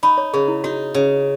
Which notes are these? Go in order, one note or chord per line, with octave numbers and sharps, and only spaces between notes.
D#4 B5
C#5
C#3 G#4
E4
D#4 F#4
C#3